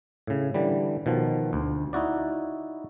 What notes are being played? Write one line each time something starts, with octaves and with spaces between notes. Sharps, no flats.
A2 C#3
D3 E3 G3
B2 D#3 F3
D2
D#4 E4 F#4 D5